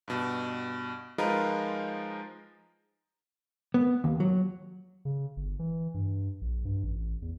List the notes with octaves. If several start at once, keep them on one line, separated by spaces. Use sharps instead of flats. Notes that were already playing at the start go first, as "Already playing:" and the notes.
G2 B2
F3 G#3 D#4 F4 A#4 B4
B3
D#2
F#3
C#3
G1
E3
G2
A#1
G2
A1
E2